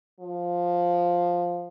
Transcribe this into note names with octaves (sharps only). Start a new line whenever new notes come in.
F3